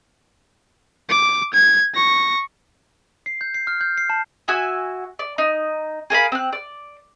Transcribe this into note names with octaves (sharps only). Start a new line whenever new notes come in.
D6
G#6
C#6 A#6
C7
G6
C7
F6
G6
C7
A5
F#4 E5 G#5 D#6
D5
D#4
G#4 A#4 F5 B5
C4 F#6
D5